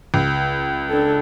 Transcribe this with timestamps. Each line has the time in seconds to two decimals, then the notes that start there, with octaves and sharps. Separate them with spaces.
0.14 C#2
0.89 D4 A4